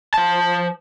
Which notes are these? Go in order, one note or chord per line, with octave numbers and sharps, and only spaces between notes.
F3 A5